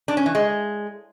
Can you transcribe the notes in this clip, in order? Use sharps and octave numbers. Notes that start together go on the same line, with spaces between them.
D4
C#4
E3
G#3